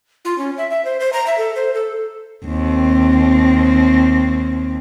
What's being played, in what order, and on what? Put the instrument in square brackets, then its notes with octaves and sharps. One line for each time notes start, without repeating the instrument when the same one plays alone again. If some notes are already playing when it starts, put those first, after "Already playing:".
[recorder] F4
C#4
E5
E5
C5
C5
A#5
E5
A4
C5
A4
[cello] D#2 C4